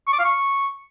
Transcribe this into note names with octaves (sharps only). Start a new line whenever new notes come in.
C#6
D6
F5
C#6